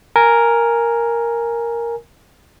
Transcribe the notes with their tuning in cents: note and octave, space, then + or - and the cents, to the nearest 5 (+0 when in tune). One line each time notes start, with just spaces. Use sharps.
A#4 +0 G#5 +0